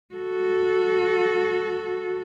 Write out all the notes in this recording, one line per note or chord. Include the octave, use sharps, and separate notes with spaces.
F#4 A4